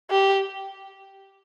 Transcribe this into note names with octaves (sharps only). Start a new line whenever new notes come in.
G4